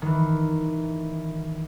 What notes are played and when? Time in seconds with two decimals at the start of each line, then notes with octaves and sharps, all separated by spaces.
0.02 D#3 E3